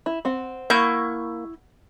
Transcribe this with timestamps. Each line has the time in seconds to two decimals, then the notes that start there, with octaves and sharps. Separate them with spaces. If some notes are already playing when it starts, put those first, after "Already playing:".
0.06 E4
0.25 C4 F#5
0.70 A#3 E4 F#5 C#6 G6